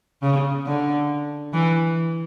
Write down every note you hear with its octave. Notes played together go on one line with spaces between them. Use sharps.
C#3
D3
E3